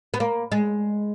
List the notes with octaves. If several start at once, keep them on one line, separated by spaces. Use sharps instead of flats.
B3
A#3
G#3